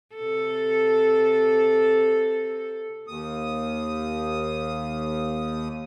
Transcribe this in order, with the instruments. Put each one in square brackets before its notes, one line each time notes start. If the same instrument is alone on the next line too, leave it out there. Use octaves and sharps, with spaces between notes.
[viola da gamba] C3 A4
[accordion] D#2 D#6